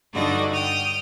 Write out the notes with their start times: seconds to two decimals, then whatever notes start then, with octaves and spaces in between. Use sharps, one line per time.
0.13 G2 D3 D#4 F#4 D5 D#5
0.52 G5 D#6 F6